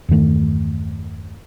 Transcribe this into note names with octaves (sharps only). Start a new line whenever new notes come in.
E2 G2 D#3 A3